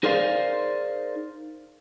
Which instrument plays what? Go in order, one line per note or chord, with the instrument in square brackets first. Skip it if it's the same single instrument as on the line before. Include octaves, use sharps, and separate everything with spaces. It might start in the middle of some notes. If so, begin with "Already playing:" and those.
[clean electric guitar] D#4 G#4 A#4 C5 D5 F5